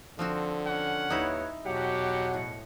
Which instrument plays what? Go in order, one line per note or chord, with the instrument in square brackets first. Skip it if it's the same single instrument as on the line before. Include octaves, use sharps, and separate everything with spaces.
[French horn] D3 [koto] F3 C4 F#4
[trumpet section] C#4 F#5
[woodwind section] D#2 B4 C#5 [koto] D#4 E4
[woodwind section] E2 B2 F#5 [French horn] F#3 [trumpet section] G4
[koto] A2